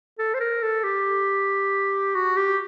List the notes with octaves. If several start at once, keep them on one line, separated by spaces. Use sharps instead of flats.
A4
C5
A#4
A4
G4
F#4
G4